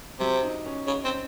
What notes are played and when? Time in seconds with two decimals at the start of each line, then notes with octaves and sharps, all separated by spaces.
0.20 C3 F#3
0.43 D#4
0.66 C#4
0.87 C#3
1.05 C4